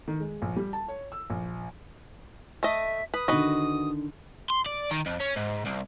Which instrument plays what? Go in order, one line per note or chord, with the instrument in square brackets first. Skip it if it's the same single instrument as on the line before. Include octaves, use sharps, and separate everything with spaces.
[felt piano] D#3
G#3
A#1
G3
A5
C#5
E6
A#1
[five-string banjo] A3 D#5 [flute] E5
[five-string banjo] B4 [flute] D#6
[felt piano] D3 D#3 [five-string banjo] F#4 B4 D#5
[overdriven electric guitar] C6
D5
D#3
F2
C#4
G#2
C2